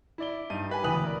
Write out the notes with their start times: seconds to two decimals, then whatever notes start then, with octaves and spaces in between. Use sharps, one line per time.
0.18 E4 D5 G7
0.50 G2 D#4 D#7
0.69 G4 B4 G#5
0.84 E1 D2 E3 B4 D#6 F#7
1.04 A#4 D5